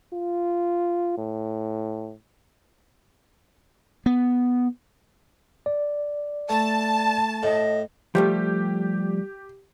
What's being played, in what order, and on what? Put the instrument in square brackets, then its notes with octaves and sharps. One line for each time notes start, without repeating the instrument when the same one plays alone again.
[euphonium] F4
A2
[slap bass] B3
[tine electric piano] D5
[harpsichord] A3 [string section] A5
[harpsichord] A2 [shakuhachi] D#5
[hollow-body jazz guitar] F3 G3 A3 [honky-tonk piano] G4